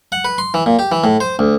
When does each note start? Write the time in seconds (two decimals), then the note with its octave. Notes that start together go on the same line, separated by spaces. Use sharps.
0.12 F#5
0.25 B4
0.38 C6
0.54 E3
0.66 A#2
0.79 G4
0.92 E3
1.04 A2
1.20 C5
1.39 D2